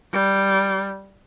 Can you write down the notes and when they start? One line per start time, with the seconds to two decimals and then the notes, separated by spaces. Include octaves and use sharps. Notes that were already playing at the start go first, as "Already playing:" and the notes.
0.13 G3